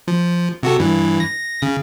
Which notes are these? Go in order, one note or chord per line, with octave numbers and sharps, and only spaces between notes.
F3
C3 F#4 A4
G2 E3
A#6
C#3